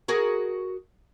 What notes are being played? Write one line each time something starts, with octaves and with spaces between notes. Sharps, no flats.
F#4 G#4 A#4